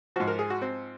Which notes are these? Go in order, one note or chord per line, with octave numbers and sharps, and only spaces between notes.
G#2 F3 F#4
A#4
G#4
F#4
C4